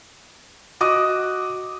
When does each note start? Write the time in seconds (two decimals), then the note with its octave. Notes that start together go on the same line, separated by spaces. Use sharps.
0.81 F#4 D#5 D6 D#6